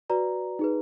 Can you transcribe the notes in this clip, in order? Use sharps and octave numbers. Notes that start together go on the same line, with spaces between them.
F#4 B4 D5 A#5
D#4 G#4 B4